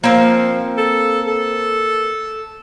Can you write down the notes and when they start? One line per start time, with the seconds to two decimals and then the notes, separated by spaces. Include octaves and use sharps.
0.04 F3 A#3 C4
0.77 A4
1.27 A4